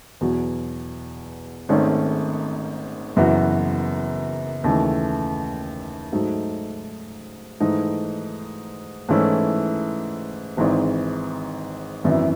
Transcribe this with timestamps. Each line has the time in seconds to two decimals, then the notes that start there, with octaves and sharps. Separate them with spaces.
0.21 E2 B2 F#3
1.69 G#1 G#2 D#3 A3 C#4
3.16 F#1 F#2 E3 B3 F#4
4.64 D#2 C#3 E3 A3
6.12 G#2 F#3 A3 D#4
7.60 G#2 E3 A3 D#4
9.09 G#2 E3 A3 C#4 E4
10.57 G#1 G#2 E3
12.04 G#1 F#2 E3 B3 E4